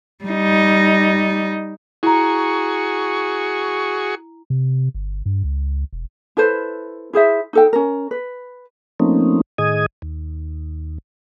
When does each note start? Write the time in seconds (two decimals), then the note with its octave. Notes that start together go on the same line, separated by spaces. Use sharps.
0.24 G3 D#4
2.03 E4 F#4 G#4 A#5 C#6
4.50 C3
4.94 G1
5.26 G2
5.44 C#2
5.93 E1
6.37 E4 A4 B4 C5
7.13 E4 G#4 C5 E5
7.53 D#4 A4 G5
7.73 C#4 A#4
8.11 B4
9.00 F3 A3 A#3 C4 C#4 D#4
9.58 A2 D#3 G#4 D#5 D#6 G#6
10.02 D#2